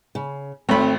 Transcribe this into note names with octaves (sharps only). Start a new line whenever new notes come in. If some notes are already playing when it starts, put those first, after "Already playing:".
C#3
G#1 A3 C4 B5